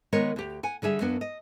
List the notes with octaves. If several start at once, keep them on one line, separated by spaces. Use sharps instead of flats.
D#3 G#3 B3 A#4 C#5
D2 G4
F#5 G#5
D3 G3 G#4 E5
F#2 A#3 B3 D4
D#5